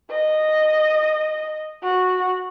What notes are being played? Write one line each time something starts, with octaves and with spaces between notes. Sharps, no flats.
D#5
F#4